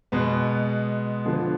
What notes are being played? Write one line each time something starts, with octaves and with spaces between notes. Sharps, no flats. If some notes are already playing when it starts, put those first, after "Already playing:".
B2 G#3 B3
D3 F3 B3